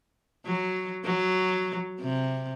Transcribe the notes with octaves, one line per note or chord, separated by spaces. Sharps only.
F#3
F#3
C3